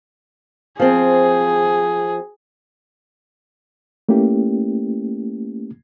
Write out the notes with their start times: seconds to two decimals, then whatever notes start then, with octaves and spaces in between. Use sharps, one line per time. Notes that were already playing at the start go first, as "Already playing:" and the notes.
0.79 F3 C4 G#4
4.09 A3 A#3 C#4 E4 G4